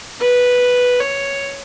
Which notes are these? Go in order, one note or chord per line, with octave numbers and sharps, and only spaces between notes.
B4
C#5